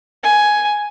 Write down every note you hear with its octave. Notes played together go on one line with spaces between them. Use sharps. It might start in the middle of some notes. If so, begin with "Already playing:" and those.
G#5